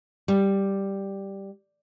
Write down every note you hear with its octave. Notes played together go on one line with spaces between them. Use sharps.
G3